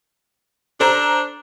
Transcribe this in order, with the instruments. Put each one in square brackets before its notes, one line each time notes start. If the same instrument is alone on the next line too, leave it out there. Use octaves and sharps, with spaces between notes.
[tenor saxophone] D4 [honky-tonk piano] A4 C5 A#5